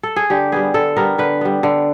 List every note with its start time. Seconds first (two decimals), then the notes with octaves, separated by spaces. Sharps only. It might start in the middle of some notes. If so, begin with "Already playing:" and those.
0.03 A4
0.16 G#4
0.30 D3 G4
0.52 G3 B3 G#4
0.74 D3 A4
0.97 G3 B3 A#4
1.18 D3 B4
1.41 G3 B3
1.63 D3